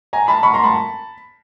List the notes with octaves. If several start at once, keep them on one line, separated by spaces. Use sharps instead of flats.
G#5 A#5
A5 B5
B5 C#6
A#5 C6
A5 B5